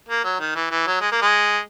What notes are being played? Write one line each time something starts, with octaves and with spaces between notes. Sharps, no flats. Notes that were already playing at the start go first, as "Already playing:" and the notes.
A#3
F#3
D#3
E3
E3
F#3
G#3
A#3
G#3